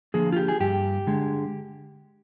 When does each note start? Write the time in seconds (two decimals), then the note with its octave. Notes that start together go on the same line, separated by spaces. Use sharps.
0.14 D3 F3 A#3 G#4
0.32 F4
0.36 G4
0.48 G#4
0.60 G2 G4
1.07 D3 G#3